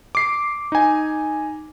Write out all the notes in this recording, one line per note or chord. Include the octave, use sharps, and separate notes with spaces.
D6 C7
D#4 G#5